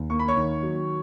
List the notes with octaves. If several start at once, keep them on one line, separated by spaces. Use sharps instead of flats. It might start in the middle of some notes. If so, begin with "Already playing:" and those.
Already playing: D#2
A#3 C#6
B5
C#5 C#6
D#3
F#3